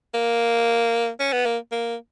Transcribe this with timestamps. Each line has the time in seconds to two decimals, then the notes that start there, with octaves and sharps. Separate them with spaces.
0.14 A#3
1.20 C#4
1.32 B3
1.46 A#3
1.72 A#3